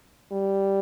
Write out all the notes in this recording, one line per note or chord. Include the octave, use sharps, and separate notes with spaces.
G3